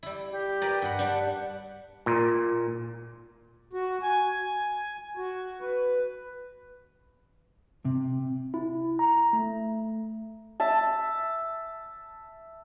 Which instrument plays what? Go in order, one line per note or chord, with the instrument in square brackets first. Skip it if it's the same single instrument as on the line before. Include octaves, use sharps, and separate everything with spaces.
[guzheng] G3 E4
[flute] G4
[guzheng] A#4 B4 D5
[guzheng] G2 B5 [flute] F#5
[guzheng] G3 D4
[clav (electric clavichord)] A#2
[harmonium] F#4
G#5
F#4
B4
[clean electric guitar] C3
[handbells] E4
A#5
A3
[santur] E5 A5